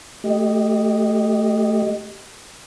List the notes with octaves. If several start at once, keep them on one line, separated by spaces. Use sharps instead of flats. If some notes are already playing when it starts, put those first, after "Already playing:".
A3 G4 D#5